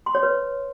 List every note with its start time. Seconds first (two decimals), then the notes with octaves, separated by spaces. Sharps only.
0.06 C6
0.15 C#5
0.23 B4